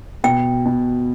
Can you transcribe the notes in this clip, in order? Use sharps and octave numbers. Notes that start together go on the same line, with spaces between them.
B2 G5
B2